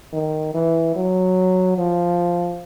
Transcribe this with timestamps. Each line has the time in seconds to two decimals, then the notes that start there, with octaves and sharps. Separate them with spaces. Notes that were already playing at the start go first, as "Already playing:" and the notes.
0.13 D#3
0.54 E3
0.95 F#3
1.78 F3